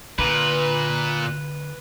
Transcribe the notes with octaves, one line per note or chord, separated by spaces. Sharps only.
A#2 D3 B4